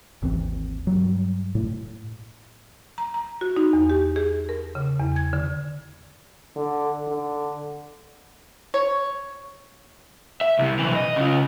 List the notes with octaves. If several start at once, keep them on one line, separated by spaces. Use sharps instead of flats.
G#1 D#2 E3 C4
G2 F#3
A2
A#5
A#5
F#4
D#4
E2
G4
G#4
A#4
C#3
E2
G#6
D3
D3
D3
C#5
E5
C2 C3
B1 E3
D#5
C#3 F4